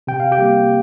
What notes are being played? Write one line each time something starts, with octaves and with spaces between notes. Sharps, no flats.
C3 G5
F5
G4 G5
G3 A#3